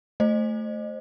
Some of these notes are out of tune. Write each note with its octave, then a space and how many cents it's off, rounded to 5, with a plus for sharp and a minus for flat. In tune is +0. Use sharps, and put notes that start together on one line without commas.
A3 +0 C5 +15 D#5 -30